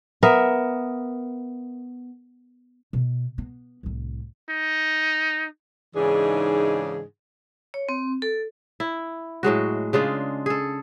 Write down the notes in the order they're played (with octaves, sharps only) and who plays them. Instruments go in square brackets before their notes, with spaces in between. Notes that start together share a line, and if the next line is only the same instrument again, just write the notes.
[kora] B3 A#4 E5
[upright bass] B2
B3
C2 A2
[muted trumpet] D#4
[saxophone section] G#2 C#3 E3 D4 D#4 G#4
[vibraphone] C#5
C4
A4
[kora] E4
A2 F#3 G#3 F#4
C#3 G#3 D4 F4
G#4 A4